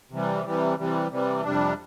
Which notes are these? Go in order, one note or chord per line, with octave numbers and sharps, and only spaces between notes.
C3 E3 G3
C3 E3 G3
C3 E3 G3
C3 E3 G3
F2 C3 G3 D4